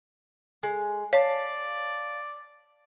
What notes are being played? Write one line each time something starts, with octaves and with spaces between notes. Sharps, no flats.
G#3
C#5 D5 F5 A5